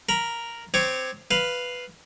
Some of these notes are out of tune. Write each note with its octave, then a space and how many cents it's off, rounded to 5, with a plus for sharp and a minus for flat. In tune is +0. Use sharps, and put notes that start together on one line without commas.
A#4 +0 B5 -20
C4 -10 C#5 +0 D6 +20
B4 +0 F5 +0